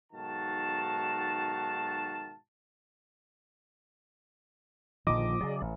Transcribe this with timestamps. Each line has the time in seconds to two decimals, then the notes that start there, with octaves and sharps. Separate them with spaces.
0.12 B1 G#2 D#3 F#4 F5 A5
5.07 A#1 A#2 D3 D#3 F3 D#5 D6
5.41 C#3 F#3 G#4 D5
5.62 A1